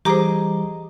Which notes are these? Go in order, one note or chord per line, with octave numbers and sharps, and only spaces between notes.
E3 G3 G4 G#4 C5 D#5 A#5 D6